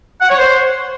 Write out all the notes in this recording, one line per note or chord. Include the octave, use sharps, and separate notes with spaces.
F#5
C#5
C5